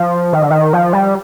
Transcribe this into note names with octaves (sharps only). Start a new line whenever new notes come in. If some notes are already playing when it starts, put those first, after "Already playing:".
Already playing: F3
D#3
D3
D#3
F3
G3